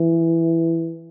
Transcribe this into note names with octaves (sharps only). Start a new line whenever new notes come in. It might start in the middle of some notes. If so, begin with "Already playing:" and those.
Already playing: E3